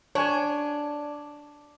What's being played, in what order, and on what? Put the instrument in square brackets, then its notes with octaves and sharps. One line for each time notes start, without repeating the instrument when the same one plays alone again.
[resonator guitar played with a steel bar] D4 [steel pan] C#5 G#5